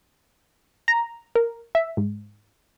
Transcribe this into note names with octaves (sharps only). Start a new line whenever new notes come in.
A#5
A#4
E5
G#2